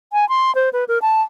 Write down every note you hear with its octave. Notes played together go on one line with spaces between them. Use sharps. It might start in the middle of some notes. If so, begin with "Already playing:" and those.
G#5
C6
C5
B4
A#4
A5